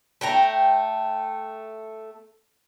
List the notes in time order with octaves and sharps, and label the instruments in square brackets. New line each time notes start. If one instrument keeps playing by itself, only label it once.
[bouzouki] A3 G5 A#5